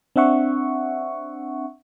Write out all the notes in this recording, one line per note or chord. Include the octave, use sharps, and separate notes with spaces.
C4 D4 E5 F#5 C#6